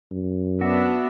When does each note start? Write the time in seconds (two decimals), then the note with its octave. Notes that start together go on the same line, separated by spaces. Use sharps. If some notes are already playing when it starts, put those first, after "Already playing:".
0.11 F#2
0.61 B3 D4 F#4 E5